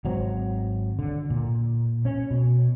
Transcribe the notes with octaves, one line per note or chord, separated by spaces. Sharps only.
G#1 F#3 C4
D3
A#2
C#4
B2